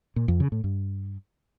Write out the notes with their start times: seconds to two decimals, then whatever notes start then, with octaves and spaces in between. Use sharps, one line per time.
0.16 A#2
0.28 F2
0.40 C#3
0.52 A2
0.64 G2